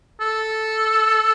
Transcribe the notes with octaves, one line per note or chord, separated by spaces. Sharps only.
A4